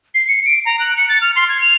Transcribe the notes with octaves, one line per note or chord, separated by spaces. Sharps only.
C7
C#7
D7
A#5
F#6
C#7
A6
F6
C6
G#6
F7